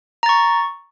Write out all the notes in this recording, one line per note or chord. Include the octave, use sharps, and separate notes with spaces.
A#5 C#6 A6